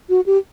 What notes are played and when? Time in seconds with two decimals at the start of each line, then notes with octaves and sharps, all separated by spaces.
0.09 F#4
0.26 G4